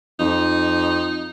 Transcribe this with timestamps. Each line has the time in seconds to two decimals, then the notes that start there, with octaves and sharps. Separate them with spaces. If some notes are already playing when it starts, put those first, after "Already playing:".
0.19 F2 D#4